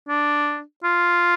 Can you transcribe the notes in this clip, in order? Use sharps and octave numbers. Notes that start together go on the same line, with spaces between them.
D4
F4